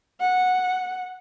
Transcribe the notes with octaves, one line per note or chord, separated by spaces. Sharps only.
F#5